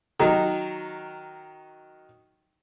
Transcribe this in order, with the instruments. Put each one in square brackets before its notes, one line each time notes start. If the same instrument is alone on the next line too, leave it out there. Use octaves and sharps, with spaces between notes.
[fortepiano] D#3 F#3 D#4